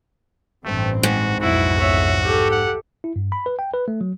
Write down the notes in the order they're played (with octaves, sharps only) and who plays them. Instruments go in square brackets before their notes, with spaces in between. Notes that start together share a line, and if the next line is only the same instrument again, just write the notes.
[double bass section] A1 G2 C4 [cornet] A3
[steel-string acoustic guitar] G#2 [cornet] F#4
[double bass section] B1 F2 [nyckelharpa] E4 [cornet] F#4
[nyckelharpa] C#5 E5
G4 A4
[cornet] F#5
[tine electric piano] E4
G2
B5
B4
G5
B4
A3
F#3